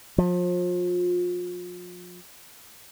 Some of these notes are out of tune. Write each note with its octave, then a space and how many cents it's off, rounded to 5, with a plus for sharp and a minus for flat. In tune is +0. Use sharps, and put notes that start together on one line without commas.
F3 +35